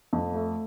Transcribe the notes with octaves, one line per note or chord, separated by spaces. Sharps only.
F2
A3